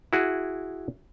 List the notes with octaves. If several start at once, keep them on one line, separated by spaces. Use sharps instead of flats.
E4 F#4 G#4